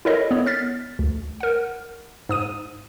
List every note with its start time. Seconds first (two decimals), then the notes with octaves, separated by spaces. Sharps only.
0.05 E4 A4 A#4 C#5 D#5
0.31 B3 C#5
0.46 F6 A6 B6
0.99 D2
1.41 A#4 F#5
2.29 G#2 D#6 D#7